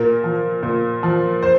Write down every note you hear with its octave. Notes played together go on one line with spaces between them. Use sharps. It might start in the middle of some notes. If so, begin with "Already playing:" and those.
Already playing: A#2 A#4
F3
A#2
F3
C5